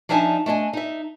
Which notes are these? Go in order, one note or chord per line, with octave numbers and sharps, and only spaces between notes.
F3 D4 D#4 E5 G#5 A5
A3 D4 D#5 G#5
D#4 E5